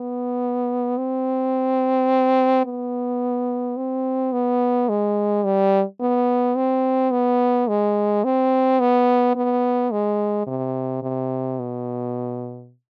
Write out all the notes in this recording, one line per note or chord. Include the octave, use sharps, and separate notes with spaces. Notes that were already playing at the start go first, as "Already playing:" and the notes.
Already playing: B3
C4
B3
C4
B3
G#3
G3
B3
C4
B3
G#3
C4
B3
B3
G#3
C3
C3
B2